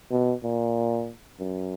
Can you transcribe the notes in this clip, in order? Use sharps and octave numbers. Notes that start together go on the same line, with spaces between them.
B2
A#2
F#2